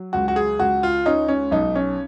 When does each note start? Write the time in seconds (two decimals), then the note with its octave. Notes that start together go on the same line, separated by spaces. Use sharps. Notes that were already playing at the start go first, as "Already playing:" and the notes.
Already playing: F#3
0.13 C#2 F#4
0.28 F#4
0.36 G#4
0.59 C#2 F#4
0.83 F4
1.06 C#4 D#4
1.28 C#4
1.51 B1 D#4
1.75 C#4